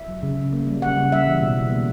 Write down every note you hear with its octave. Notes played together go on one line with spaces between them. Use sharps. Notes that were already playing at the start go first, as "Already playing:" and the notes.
Already playing: E5
F#3
C#3
C#3
A#3
G3
C#3 F#5
C#3
G3 E5
E3
B2
B2
A#3